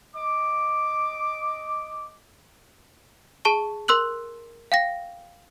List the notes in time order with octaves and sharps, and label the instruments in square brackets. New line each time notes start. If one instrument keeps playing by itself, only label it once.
[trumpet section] D#5 D6
[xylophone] G#4 A5 C#6 G7
A#4 C6 E6 F#6 F#7
F5 G5 A#6